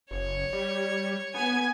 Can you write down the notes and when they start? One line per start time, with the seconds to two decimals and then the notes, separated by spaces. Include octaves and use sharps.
0.11 F#1 C#5
0.53 G3
1.34 B3 G#5